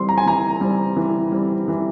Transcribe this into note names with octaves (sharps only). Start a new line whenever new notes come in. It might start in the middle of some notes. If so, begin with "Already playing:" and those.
Already playing: E3 G3 C4 C6
A#5
G#5
E3 A#5
G3 C4
E3
G3 C4
E3